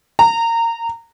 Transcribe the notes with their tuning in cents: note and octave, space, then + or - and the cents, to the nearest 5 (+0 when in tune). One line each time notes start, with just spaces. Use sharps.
A#5 -20